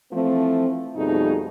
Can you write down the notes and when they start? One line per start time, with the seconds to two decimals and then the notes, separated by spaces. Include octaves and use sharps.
0.11 E3 F3 A3 C4
0.96 F2 B2 G3 A3 D#4 G#4